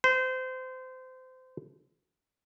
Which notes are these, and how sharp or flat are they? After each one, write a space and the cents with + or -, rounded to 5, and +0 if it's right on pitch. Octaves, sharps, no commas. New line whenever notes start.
C5 -25